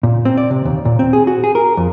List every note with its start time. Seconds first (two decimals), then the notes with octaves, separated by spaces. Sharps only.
0.03 A#2
0.25 C4
0.37 D5
0.51 C3
0.65 D#2
0.85 A#2
0.99 C4
1.13 G#4
1.27 F#4
1.44 G#4
1.55 A#4
1.77 F2